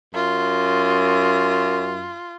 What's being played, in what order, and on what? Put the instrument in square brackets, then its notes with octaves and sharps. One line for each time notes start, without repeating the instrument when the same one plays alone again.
[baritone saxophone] F#2 [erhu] F4